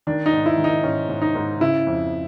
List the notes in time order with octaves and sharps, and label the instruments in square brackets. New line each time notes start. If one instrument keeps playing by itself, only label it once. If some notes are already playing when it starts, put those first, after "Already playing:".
[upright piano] D#3 D4
D#4
G#2
E4
D#3
D#4
G#2 C#4
G#2
D#4
G#2
C#3 E4
F2